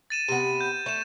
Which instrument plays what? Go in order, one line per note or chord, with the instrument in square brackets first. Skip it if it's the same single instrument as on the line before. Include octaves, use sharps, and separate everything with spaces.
[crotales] A6 D#7 E7
[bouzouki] C3 B3 [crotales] D#7
[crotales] G6
[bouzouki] A3 [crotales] G6 E7